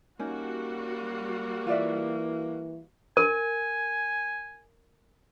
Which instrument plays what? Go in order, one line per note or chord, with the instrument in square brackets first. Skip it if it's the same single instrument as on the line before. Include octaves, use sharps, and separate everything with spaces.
[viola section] G3 F#4 [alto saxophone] A#3 [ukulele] C#4 D#4
[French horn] E3 [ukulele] F4 D5 E5
[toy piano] A#4 [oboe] G#5